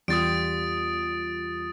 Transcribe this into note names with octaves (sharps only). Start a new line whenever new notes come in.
E2 G3 F4 D#6 A6 D7